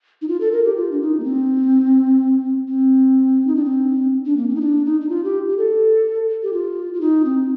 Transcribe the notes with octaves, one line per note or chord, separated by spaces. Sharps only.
D#4
F4
A4
A#4
G4
F4
D4
D#4
A#3
C4
C4
D#4
D4
C4
D4
A#3
C4
D#4
D4
D#4
D#4
F4
G4
G4
A4
G4
F4
F4
D#4
C4